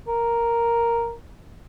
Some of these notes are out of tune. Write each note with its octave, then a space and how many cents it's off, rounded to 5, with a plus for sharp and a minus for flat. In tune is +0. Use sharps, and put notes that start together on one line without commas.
A#4 +0